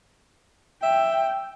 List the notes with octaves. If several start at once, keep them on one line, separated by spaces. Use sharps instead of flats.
E5 G5